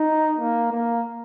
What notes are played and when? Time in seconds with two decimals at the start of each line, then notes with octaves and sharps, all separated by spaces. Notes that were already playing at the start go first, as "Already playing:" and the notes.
Already playing: D#4
0.39 A#3
0.72 A#3